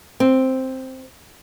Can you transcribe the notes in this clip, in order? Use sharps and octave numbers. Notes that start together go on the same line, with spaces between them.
C4